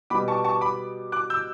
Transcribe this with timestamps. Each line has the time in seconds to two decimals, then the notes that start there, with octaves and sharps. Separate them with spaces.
0.10 B2 G3 B3 B5 D6
0.28 A5 C#6
0.44 A5 C#6
0.61 B5 D6
1.12 D6 F#6
1.30 E6 G6